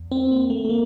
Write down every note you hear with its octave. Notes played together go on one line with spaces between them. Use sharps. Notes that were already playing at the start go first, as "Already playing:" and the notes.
Already playing: E2
C4
A#3
A3
A3
A#3